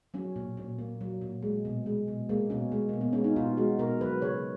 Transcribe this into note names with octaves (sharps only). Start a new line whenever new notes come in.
F#3 C#4
A#2
A#2
A#3
F#3
A#2
G#3
B2
G#3
B2
G#3 A#3
B2 C#4
G#3
B2 A#3
B3
G#3 C#4
D#4
B2 F4
G#3 F#4
B2 A#4
F#3 B4
C#3 C#5